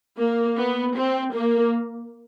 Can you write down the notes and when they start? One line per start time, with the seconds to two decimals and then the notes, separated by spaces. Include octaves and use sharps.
0.18 A#3
0.58 B3
0.96 C4
1.35 A#3